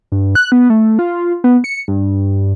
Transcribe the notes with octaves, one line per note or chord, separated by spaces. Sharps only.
G2
F#6
B3
A3
F4
B3
C#7
G2